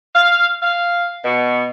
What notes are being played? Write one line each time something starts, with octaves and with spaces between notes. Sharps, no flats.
F5
F5
B2